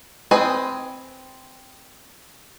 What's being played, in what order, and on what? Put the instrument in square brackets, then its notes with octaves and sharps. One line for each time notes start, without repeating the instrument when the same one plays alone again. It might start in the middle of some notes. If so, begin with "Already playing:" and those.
[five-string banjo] C4 B4 D#5 G#5